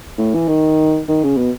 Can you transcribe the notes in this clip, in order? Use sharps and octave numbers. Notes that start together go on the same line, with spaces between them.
A2
E3
D#3
D#3
C#3
B2